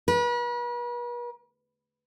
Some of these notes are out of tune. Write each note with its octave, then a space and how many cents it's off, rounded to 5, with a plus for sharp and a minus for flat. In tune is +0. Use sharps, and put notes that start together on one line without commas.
B4 -40